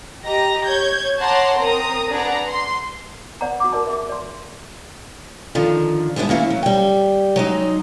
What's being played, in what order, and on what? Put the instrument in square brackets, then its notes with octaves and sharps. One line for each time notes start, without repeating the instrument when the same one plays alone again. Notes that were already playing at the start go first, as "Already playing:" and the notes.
[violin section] G4 D#5 A#5 A#6
C#5 G6 G#6
C#5 F#5 A5 A#5 C6 D6
C4 A#4 A#5 D#6
D4 G#4 B4 D5 F#5 A#5
C6
[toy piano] D5 F#5 A#5
F#4 D6
F#4 A#4 D5 A5
G#4 E5
D5 C6
[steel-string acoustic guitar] D3 D#3 F3
G3 G#3 B3 D4 E4
D#3 A#3 C#4 E4
F#3
G3 G5
F#3 G#3 D#4